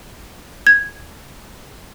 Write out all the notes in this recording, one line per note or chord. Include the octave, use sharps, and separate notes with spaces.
G#6